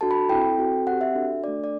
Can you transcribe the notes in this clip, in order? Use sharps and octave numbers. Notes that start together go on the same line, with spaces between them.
D4 F#4 A4 A5
B5
C4 E4 A4 G5
C4 F#4 A4
C4 G4 F#5
E5
D4 F#4 A4
A3 D4 A4 D5
D5